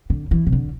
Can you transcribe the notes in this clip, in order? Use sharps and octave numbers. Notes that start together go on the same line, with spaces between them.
D3
E3
C3
D3